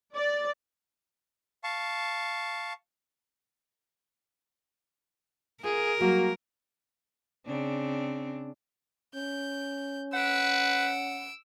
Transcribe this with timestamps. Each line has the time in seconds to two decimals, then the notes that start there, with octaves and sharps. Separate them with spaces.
0.15 D5
1.64 F5 A5 C#6
5.64 F4 G#4 A#4
6.00 F#3 G3 A#3 F#4
7.46 C#3 C4 D4
9.15 C#4 G6
10.14 B4 F#5 E6 D7